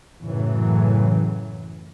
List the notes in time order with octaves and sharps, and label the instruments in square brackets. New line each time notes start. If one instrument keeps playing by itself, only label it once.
[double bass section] F#2 A2 C#3 E3 F#3